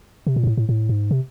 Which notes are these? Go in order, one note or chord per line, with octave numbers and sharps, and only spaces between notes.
C3
A#2
G#2
A2
A2
A2
G#2
C3